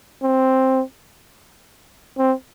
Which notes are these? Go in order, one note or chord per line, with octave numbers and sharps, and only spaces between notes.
C4
C4